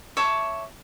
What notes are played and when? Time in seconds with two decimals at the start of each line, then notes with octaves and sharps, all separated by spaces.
0.17 C#5 E5 A5 D6